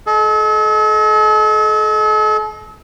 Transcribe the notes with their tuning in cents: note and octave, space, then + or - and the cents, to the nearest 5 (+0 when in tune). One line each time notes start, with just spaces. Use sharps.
A4 -40 D#5 +0